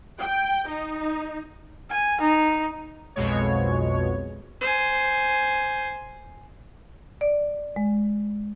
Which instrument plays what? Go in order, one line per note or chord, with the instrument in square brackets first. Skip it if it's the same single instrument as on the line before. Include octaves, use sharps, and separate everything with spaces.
[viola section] G5
D#4
[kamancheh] G#5
D#4
[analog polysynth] B1 F2 B2 G#3 C#5
[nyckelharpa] C5 G#5
[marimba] D5
G#3